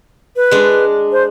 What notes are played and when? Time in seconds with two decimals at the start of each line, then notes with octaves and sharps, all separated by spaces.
0.36 B4
0.51 G#3 D4
1.12 C5